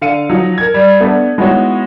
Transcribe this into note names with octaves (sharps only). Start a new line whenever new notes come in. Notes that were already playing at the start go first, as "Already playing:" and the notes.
D3 F5 C#7 D#7
F3 F#3 D#4
A#4 G#6
G3
A3 B3 D4
G#3 B3 D#4 E4 F#4 C#5